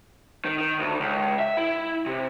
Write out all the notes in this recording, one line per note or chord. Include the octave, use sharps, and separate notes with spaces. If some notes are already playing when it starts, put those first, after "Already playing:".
D#3
D#3
D2
C#2
E5
E4
C3